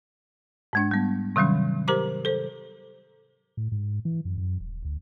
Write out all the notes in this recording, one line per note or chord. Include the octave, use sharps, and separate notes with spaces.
G#2 G#3 D4
G3 B3
C3 D#3 F#3 G3 C#4
G4 A#4 C5 A#5 D6
A4 C5
A2
G#2
E3
F#2
F#2
D#1
D2